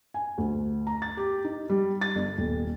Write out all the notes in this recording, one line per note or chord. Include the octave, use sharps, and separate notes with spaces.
G#5
D2
A#5
A6
G4
D#4
G3
A6
G1
D#1